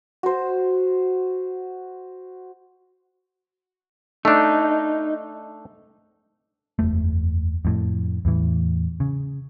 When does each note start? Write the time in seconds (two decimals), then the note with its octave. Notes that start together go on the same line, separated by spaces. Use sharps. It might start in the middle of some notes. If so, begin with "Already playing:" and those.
0.23 F#4 C5
4.25 A3 D4 D#4
6.79 F#1 E2 A3
7.65 F2 A2
8.25 E2 A2 E3
9.00 C#3